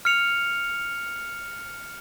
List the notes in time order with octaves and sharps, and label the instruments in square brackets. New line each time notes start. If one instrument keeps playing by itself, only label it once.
[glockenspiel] F6 C#7 F7